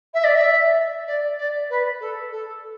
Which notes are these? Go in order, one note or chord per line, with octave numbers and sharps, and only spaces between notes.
E5
D5
E5
D5
D5
B4
A4
A4